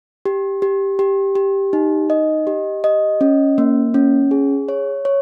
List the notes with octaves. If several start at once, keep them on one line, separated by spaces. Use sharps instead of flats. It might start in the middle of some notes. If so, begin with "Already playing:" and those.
G4
G4
G4
G4
D#4
D#5
G4
D#5
C#4
A#3
C#4
G#4
C#5
C#5